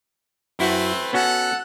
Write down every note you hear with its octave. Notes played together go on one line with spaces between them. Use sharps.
F#2 A3 C4 E4 F#4 B4
B3 C#4 F#4 A4 F#5